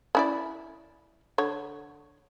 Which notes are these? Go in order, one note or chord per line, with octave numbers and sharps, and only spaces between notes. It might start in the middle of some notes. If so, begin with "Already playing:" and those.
C#4 E4 D5
D3 C#5